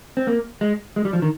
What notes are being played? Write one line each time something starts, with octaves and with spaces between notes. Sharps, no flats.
C4
A#3
G#3
G#3
G3
F3
D#3